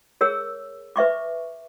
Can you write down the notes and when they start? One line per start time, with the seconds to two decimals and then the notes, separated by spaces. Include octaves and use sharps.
0.21 G#4 A#4 C#5 E6
0.96 B4 E5 C#6 D6